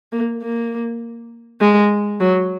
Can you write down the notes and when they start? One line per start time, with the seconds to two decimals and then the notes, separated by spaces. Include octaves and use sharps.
0.12 A#3
0.42 A#3
1.61 G#3
2.20 F#3